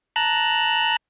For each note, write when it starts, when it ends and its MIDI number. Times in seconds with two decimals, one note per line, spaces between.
0.16 0.96 81
0.16 0.96 82
0.16 0.96 90